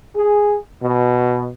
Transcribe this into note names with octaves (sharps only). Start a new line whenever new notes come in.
G#4
B2